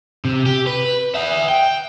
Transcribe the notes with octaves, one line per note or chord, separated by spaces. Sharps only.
C3
G4
B4
E5 F#5
G5